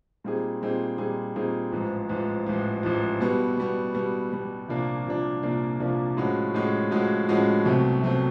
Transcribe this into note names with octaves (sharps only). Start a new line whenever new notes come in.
A#2 G3 C4 D#4 G#4
A#2 G3 C4 D#4 G#4
A#2 G3 C4 D#4 G#4
A#2 G3 C4 D#4 G#4
A1 G#2 F3
A1 G#2 F3
A1 G#2 F3
A1 G#2 F3
B2 G3 B3
B2 G3 B3
B2 G3 B3
B2 G3 B3
C2 A#2 F3 A#3 D4
C2 A#2 F3 A#3 D4
C2 A#2 F3 A#3 D4
C2 A#2 F3 A#3 D4
A2 F3 G#3 C#4 F#4
A2 F3 G#3 C#4 F#4
A2 F3 G#3 C#4 F#4
A2 F3 G#3 C#4 F#4
C2 B2 F#3 A3 C4
C2 B2 F#3 A3 C4